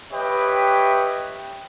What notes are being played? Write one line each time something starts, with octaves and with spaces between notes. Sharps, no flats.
G4 B4 C#5 D#5 E5 G5